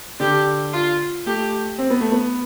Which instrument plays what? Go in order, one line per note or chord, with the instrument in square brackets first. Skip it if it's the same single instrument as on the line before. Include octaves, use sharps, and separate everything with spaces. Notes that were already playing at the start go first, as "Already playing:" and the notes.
[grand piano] D3 [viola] G4
[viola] F4
[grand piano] A3 [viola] G4
[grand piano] C4
B3
A3
B3